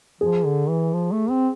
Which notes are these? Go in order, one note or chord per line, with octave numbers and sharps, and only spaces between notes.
F3 G#4
D3
E3
F3
A3
C4